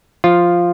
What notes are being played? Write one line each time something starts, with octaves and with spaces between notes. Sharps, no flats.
F3 F4